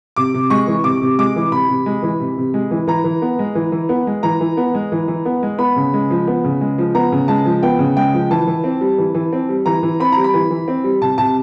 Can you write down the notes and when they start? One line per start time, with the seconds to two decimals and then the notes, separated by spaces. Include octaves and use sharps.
0.16 C3 D6
0.34 C3
0.50 G#3 C#6
0.67 E3
0.84 C3 D6
1.02 C3
1.19 G#3 D6
1.36 E3
1.52 C3 B5
1.69 C3
1.86 G#3
2.03 E3
2.20 C3
2.38 C3
2.54 G#3
2.71 E3
2.87 E3 A#5
3.04 E3
3.22 B3
3.39 G#3
3.55 E3
3.72 E3
3.89 B3
4.07 G#3
4.23 E3 A#5
4.41 E3
4.57 B3
4.75 G#3
4.92 E3
5.08 E3
5.26 B3
5.43 G#3
5.59 B3 B5
5.76 C#3
5.94 G#3
6.11 F3
6.28 B3
6.44 C#3
6.61 G#3
6.78 F3
6.95 B3 A#5
7.12 C#3
7.28 G#3 A5
7.46 F3
7.63 B3 G5
7.79 C#3
7.96 G#3 G5
8.14 F3
8.31 E3 A5
8.47 E3
8.64 C4
8.81 G3
8.98 E3
9.14 E3
9.33 C4
9.49 G3
9.66 E3 A#5
9.83 E3
10.00 C4 B5
10.12 G3 A#5
10.24 B5
10.34 E3
10.50 E3
10.68 C4
10.84 G3
11.01 C3 A5
11.18 C3 A5